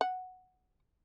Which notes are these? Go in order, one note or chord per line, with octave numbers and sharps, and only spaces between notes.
F#5